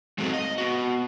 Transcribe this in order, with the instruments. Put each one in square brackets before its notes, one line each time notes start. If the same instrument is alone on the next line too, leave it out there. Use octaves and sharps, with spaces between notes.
[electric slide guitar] G#3 C4 D#4 F#4 A4 F5
D#5
B3 F#4